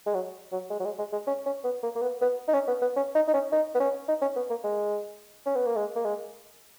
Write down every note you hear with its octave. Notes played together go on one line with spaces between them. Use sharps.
G#3
F#3
F#3
G#3
F#3
G#3
G#3
G#3
C#4
C#4
B3
A#3
A#3
B3
B3
D#4
C#4
B3
B3
C#4
D#4
D#4
C#4
D#4
B3
C#4
D#4
C#4
B3
A#3
G#3
C#4
B3
A#3
G#3
A#3
G#3